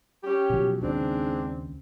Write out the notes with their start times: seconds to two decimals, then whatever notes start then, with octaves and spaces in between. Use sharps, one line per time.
0.24 C#4 G4
0.50 B2 F3 F#3
0.81 D#2 G#2 C#3 C4 D4